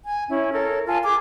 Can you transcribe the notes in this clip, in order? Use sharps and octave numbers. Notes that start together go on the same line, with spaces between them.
G#5
C#4 E4
A4 A#4 C#5
F4 G#5 A5
G#4 D6